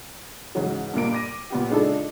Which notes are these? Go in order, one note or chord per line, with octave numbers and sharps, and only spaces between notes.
G#2 C#3 E3 F#3
G2 A#2 A#3 D7
D6 A#6 D#7
A#2 B3 G4
C#3 G#3 D4 D#4 F4 A4